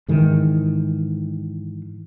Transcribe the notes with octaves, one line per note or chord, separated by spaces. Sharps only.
G#2 D#3 E3